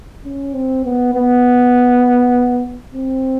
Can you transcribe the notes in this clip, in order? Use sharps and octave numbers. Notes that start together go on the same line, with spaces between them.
C#4
C4
B3
B3
C4